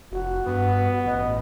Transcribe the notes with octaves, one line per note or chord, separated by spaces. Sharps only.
F1 F#4
G2 B3
A1 D#5